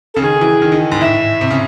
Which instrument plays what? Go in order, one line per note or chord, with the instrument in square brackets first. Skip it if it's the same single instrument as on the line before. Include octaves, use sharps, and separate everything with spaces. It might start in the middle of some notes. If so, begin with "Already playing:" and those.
[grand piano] C#3 [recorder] A4
[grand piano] D#3 [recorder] G#4
[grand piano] E3
D#3
D#3
G#2
[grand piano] A2 [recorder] E5
[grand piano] C3
C#3